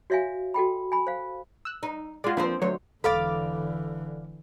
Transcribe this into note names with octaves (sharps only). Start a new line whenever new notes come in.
F#4 C#5 E5 F5 G#5
F#4 A4 G5 B5
G#5 B5
C5 F5
E6 F#6
D#4
G#3 F4 F#4 D5
F3 A#3 C4 D4 B4 C5
D2 F#3 A3 C5 C#5
E1 D3 E3 C#4 A4 D5 F5 B5